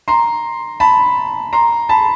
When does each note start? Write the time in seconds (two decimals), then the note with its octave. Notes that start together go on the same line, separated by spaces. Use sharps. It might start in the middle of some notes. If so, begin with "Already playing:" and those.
0.08 A#5 C6
0.80 A5 B5
1.53 A#5 C6
1.89 A5 B5